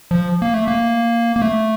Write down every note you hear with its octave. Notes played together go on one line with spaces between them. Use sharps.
F3
A#3
A3
A#3
A#3
A3